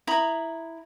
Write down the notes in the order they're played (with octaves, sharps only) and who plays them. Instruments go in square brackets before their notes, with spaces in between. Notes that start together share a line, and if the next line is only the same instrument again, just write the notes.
[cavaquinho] E4 A#5 B5 D#6